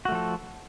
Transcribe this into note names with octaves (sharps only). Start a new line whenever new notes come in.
F3 A3 F#4 A4